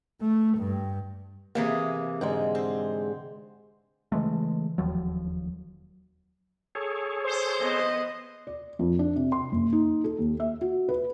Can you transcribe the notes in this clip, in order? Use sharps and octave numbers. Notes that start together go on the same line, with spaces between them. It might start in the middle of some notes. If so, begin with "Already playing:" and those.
A3
G2
C3 E3 A#3 G#4
G#2 D3 G#3
C4
C#3 E3 G#3 A3
E1 D#2 F3 F#3
G#4 A4 C#5
C5
B3 D#5
D5
F2
D4
C3
C6
F#1
D#4
A4
D#2
E5
F#4
B4